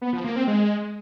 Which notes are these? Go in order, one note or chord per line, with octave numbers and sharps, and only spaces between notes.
B3
F3
A#3
C4
G#3